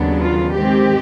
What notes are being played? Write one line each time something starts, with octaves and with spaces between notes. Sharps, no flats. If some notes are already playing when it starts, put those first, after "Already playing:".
Already playing: D#2 C#3 F#3 B3 D4
F4
G#2 D#3 G#3 C4 G4